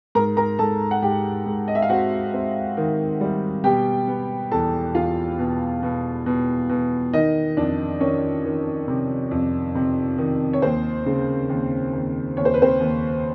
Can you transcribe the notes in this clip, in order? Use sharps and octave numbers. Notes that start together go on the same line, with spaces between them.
G#2 A#4 A#5
A#4 A#5
G#2 A4 A5
F#5
G#2 G4 G5
G#2
D#5
E5
F5
C4 F#4 F#5
C4
D#3
G3
B2 G4 G5
B3
E2 A4 A5
E2 F4 F5
B2
B2
B2
B2
D#3 D#4 D#5
F2 D4 D5
D#3 C#4 C#5
D#3
C3
F2
C3
D#3
C#5
D#2 C4 C5
C#3
D#2
D#2
D#2 C#5
C5
B4
C4 C5
D#2